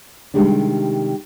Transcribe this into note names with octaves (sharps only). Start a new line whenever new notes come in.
C3 D#3 G3 G#3 D4